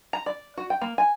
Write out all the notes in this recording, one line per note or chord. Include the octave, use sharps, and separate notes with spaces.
A#5
D5
F#4
G5
A#3
G#5